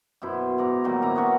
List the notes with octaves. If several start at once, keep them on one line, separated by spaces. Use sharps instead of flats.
F#2 B2 E4 C5
G#2 D5 A#5
A#2 D#3 F#3 G3
C4 E4 D5 A#5
B3 C#4 F#4 E5